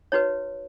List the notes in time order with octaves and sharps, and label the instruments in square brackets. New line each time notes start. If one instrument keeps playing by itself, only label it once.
[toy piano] D#4 F#4 B4 C#5